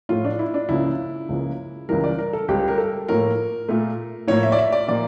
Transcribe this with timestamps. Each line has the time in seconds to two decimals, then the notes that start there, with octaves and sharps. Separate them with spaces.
0.09 A2 F3 A3 F4
0.25 D4
0.39 E4
0.54 D4
0.69 C#2 C#3 F3 A#3 E4
1.29 C#2 C#3 F3 A#3
1.89 C#2 C#3 E3 G3 A#4
2.04 D5
2.19 A#4
2.33 A4
2.48 C#2 C#3 G3 G4
2.68 A#4
2.78 A4
3.08 A2 F3 A#3 A#4
3.69 A#2 A3
4.28 A2 F3 A#3 C#5
4.43 E5
4.52 D5
4.58 E5
4.72 D5
4.88 A#2 F3 A#3 D5